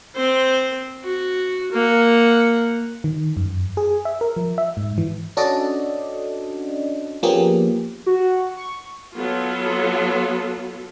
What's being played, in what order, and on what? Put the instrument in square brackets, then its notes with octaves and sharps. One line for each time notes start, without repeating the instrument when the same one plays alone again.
[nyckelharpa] C4 C5
F#4
A#3 F#5
[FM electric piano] D#3
F#2
G#4
E5
A#4
F3
E5
G#2
E3
C#4 D4 F#4 A4 D5 D#5
F3 A#3 B3 C#4 G4 G#4
[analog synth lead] F#4
C#6
[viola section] F#3 B3 F4 A4